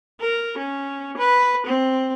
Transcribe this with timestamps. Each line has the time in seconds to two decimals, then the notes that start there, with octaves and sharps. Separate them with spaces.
0.21 A#4
0.58 C#4
1.18 B4
1.67 C4